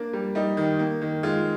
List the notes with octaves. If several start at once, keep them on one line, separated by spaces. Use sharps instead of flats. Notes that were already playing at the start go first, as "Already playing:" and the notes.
Already playing: A#3 D4
G3
G3 D#4
D#3
A#3
D#3
G#3 F4